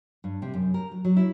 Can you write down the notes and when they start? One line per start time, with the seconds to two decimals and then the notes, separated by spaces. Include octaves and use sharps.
0.24 G2
0.42 C3
0.54 F#2
0.74 A#4
0.91 F#3
1.05 F#3
1.17 E4